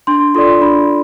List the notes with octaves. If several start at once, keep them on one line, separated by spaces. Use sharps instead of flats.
D4 C6
F4 A4 D5 C6
D4 B5